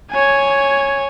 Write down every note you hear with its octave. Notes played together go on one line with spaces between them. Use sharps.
C#5 G#5